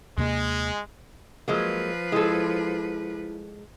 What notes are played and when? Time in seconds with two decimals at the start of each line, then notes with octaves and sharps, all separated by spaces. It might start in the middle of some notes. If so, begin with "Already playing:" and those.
0.17 D#2 C3 G#3 A#3
1.48 F3 F#3 G#3 A#3 B4
2.12 G#3 E4 A4